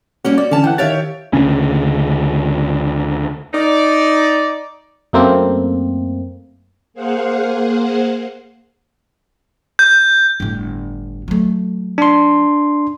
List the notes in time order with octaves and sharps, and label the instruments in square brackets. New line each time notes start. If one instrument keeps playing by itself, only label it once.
[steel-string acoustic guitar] G3 A#3 C#4 [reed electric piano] F#4
[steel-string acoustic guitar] F#4 [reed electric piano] D5
[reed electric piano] D3 E3 [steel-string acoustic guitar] C#4 A5
[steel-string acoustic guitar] E3 [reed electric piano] F#5 G5
[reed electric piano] D#3 F5 A6 [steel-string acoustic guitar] G4 C#5 E5
[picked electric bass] D2 C#3 C#4
[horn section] D#4 D5
[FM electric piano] F#2 A3 A#3 C4
[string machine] A#3 G#4 C5 F5 F#5
[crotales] G6
[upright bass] G1 A2
F#3 A3
[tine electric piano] D4 C6